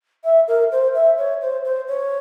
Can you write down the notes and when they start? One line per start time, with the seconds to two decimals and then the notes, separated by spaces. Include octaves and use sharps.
0.24 E5
0.48 A#4
0.72 C5
0.94 E5
1.18 C#5
1.41 C5
1.65 C5
1.88 C#5